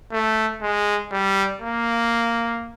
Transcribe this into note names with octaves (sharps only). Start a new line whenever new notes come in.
A3
G#3
G3
A#3